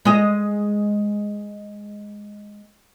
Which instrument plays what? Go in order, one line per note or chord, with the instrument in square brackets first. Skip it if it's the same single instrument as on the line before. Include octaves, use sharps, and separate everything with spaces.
[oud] G#3 D#5